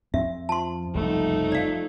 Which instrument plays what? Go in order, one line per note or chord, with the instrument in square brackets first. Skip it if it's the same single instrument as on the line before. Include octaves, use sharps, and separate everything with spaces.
[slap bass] F2 C4 [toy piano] E5
[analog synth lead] F3 [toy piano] A5 C6
[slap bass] F#1 C2 F2 [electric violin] A3 D#4
[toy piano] D5 F5